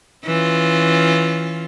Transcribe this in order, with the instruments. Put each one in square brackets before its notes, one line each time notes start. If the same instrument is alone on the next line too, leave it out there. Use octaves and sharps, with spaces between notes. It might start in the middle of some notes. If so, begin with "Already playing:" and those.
[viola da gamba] E3 C#4 F4